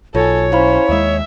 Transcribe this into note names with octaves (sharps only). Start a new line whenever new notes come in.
B1 F4 A4 C#5 G#5
C#4 E4 C5 F5 B5
D#2 G#3 E5